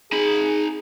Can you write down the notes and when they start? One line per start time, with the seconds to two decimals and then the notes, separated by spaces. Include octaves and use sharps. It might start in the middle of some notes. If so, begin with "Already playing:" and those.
0.13 D#4 G#4 B5